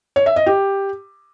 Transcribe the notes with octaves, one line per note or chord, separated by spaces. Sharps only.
C#5
E5
D#5
G4